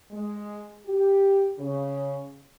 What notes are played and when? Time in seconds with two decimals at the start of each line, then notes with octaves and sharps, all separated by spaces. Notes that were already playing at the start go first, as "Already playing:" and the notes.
0.11 G#3
0.87 G4
1.59 C#3